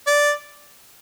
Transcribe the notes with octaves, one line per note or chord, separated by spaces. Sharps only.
D5